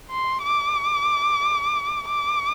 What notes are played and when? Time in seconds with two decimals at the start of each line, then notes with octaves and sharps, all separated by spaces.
0.11 C6
0.44 D6
2.08 D6